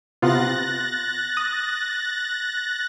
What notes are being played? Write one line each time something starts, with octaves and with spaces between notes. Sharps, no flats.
C3 B3 F4 F#6 A6 A#6
D#6